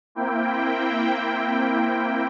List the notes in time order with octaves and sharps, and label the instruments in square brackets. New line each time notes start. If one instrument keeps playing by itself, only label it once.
[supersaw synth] A#3 C4 E4 G5